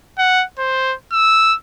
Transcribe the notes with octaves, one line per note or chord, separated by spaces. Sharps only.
F#5
C5
E6